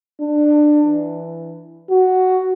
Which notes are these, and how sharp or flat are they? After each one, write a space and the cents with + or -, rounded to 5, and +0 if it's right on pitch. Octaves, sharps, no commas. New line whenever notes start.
D4 +20
E3 +10
F#4 +5